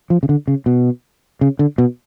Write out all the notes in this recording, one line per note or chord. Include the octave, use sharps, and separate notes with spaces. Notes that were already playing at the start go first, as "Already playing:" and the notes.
F3
C#3
D3
C#3
B2
C#3
D3
B2